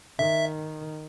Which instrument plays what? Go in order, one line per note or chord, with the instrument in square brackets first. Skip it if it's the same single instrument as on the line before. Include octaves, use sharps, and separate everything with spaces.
[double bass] D#3 [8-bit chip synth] E5